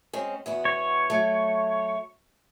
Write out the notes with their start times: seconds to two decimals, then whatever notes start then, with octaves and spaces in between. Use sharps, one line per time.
0.13 G#3 C4 C#4
0.46 E2 B3 F#4
0.65 C#5
1.10 F#3 A3